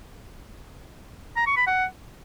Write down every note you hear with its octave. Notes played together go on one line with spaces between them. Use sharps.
A#5
C#6
B5
F#5